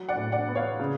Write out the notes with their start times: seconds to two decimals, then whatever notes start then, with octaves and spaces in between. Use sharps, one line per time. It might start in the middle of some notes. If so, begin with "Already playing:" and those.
Already playing: F#3
0.09 D5 F#5
0.16 A2
0.32 D5 F#5
0.48 B3
0.55 C#5 F5
0.79 C#3